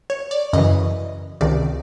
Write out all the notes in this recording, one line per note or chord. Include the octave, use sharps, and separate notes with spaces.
C#5
D5
F#2 C#3 E3 D#5
C#2 C3 D#3 D5